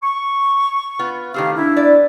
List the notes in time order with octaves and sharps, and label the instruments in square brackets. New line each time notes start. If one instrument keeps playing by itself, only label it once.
[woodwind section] C#6
[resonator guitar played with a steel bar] B3 F4
[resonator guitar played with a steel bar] D#3 A3 C4 [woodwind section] E4 G4 F5
[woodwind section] D4 E4
[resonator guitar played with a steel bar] B3 D5